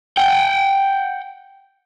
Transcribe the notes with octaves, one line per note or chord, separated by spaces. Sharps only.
F#5 G5